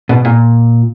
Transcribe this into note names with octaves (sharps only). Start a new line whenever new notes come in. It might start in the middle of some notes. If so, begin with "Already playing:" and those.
B2
A#2